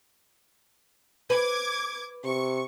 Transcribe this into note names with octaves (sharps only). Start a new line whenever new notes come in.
B4 D6 G#6
C3 C#6